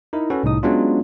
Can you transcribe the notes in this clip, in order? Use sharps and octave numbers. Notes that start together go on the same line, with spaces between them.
D#4 E4 A#4
C#4 F#4 A4 B4
C2 A2 D#4 D#6
F#3 G#3 B3 C#4 D4 F4